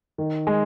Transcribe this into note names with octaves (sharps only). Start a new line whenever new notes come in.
D#3
G#3